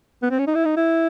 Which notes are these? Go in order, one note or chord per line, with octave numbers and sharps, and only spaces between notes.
B3
C4
C#4
D#4
E4
D#4
E4